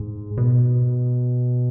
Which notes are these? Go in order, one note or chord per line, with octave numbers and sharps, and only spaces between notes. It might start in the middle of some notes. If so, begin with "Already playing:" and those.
Already playing: G#2
B2